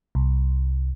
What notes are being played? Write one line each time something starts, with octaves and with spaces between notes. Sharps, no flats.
C2